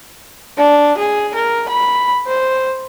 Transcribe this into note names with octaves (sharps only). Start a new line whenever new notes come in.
D4
G#4
A#4
B5
C5